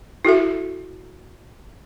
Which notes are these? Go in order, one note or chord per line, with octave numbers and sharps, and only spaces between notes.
E4 F#4 A4 E5